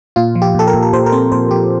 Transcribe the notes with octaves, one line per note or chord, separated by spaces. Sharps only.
A#2 F4
F3
G4
A#2 A4
A#4
A#2
A#4
A#2 C5
A#4
C4 C5
A#2 C5
F3 G4